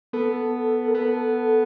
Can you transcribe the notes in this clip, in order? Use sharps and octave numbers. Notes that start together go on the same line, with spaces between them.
B3 A4
A#4
B3 A4